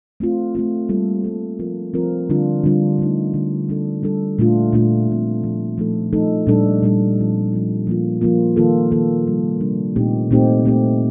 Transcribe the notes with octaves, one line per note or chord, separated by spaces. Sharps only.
A3 C4 F4
A3 C4 F4
G3 A#3 F4 A4
G3 A#3 F4 A4
F3 C4 F4 A#4
F3 C4 F4 A#4
D3 G3 D4 F4
D3 G3 D4 F4
D3 A3 D#4
D3 A3 D#4
G3 D4 A4
G3 D4 A4
A#2 A3 D4 F4
A#2 A3 D4 F4
A#2 F3 C4
A#2 F3 C4
F3 A3 D#4 A4
F3 A3 D#4 A4
A#2 G3 D4 A4
A#2 G3 D4 A4
F3 C4 F4
F3 C4 F4
F3 A#3 F4
F3 A#3 F4
D#3 A#3 F4 A4
D#3 A#3 F4 A4
C3 G3 D4
C3 G3 D4
A#2 A3 C4 D#4 G4
A#2 A3 C4 D#4 G4
A3 C4 G4